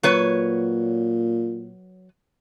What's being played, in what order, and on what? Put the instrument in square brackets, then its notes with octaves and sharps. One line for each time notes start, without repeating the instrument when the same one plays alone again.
[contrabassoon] A#2 [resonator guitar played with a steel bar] F#3 B4 C#5